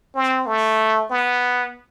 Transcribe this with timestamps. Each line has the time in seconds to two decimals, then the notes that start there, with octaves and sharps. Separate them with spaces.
0.15 C4
0.47 A3
1.10 B3